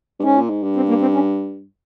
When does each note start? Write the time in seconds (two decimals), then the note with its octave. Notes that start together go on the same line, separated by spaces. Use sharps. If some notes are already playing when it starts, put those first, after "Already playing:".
0.20 G2
0.24 G#2 C#4
0.38 A#2
0.50 G#2
0.63 G2
0.76 C4
0.89 A#3
1.01 C4
1.14 C#4